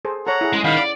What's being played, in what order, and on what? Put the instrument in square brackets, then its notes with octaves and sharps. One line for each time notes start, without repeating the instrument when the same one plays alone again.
[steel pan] G#4 A4 C5
[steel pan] A4 C#5 [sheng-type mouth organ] F#5 A#5
[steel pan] E4 G#4
[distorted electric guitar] G#3 [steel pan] C#4
[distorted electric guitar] D#3 [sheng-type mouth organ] F5 B5 [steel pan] F#5
[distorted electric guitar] D5